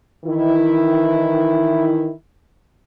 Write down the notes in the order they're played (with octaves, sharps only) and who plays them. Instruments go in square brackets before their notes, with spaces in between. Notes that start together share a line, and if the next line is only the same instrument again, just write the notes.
[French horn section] D#3 E3 E4